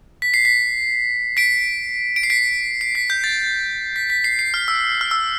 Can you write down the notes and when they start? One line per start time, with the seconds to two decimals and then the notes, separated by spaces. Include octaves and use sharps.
0.22 B6
0.34 C7
0.45 B6
1.37 B6 D7
2.16 D7
2.23 C7
2.30 B6 D7
2.81 C7
2.95 B6
3.10 G6
3.24 A6
3.96 B6
4.10 B6
4.24 C7
4.39 C7
4.54 F6
4.68 E6
5.01 F6
5.11 E6